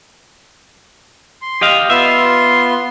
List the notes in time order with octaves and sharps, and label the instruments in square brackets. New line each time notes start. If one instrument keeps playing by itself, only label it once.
[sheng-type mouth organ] C6
[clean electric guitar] G4 D#5 F5
[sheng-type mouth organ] B3 F4 C6 [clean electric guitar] E5